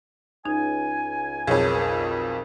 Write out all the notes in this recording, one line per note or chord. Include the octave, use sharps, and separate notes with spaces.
C#2 D#4 G#5
B1 F2 G#4 A#4 C#5